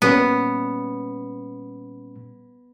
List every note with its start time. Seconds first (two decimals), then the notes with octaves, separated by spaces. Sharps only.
0.02 A#2 G3 B3 C#4